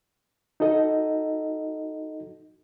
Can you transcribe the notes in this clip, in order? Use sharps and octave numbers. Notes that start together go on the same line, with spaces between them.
D#4 F#4 A4 D#5